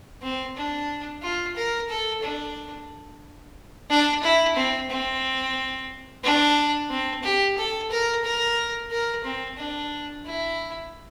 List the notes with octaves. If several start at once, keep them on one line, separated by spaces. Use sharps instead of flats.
C4
D4
F4
A#4
A4
D4
D4
E4
C4
C4
D4
C4
G4
A4
A#4
A#4
A#4
C4
D4
E4